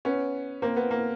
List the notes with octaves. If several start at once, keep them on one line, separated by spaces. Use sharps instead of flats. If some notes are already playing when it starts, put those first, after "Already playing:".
B3 C#4
A#3 C4
B3
A#3